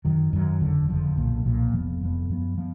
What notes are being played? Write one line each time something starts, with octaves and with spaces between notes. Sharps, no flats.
F#2 D#3 F#3
F#2 D#3 F#3
F#1 F2 D3 F3
F#1 F2 D3 F3
B1 A#2 F3
B1 A#2 F3
F1 F2 F3 B3
F1 F2 F3 B3
F#2 F3 B3
F3 B3